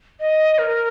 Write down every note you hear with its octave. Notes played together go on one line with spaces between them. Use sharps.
D#5
A#4